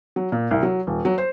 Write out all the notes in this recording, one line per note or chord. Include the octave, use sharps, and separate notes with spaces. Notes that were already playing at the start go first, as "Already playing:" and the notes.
F#3
A#2
C2
F#3
D#1
F#3
C5